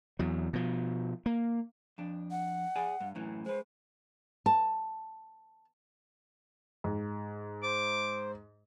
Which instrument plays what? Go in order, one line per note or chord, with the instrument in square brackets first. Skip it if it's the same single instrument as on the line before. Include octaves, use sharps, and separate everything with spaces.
[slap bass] E2 F#3
B2 F3
A#3
[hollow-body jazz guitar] F2 D4
[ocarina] F#5
[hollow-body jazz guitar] G#4 D5 G#5
G2
F#2 A2 E3
[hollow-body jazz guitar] G#3 B4 [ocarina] C5
[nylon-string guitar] A5
[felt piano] G#2
[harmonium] C5 [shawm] D6